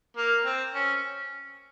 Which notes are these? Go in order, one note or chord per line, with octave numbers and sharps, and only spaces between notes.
A#3
C4
C#4